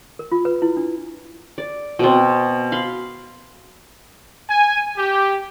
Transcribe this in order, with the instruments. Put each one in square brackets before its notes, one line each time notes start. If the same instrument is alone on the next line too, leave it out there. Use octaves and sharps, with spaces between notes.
[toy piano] A#4
F4
B4
E4
D4
[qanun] D5
B2 C4
F5 B5 C6
[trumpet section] G#5
G4